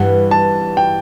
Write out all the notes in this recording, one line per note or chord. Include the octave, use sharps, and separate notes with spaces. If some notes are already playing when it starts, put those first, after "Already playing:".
Already playing: G2 E3 G3 F#5
A5
G5